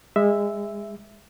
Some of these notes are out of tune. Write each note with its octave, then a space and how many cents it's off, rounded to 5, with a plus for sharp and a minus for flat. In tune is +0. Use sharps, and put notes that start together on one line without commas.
G#3 -25 E5 +0